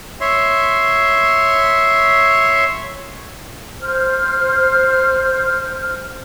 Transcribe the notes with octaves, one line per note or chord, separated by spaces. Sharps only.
C#5 E5 C6
C5 F6